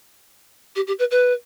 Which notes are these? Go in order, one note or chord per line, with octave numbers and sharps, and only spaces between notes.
G4
G4
B4
B4